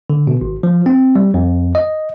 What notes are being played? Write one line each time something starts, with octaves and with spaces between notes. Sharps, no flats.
D3
B2
G#1
F3
C4
G3
F2
D#5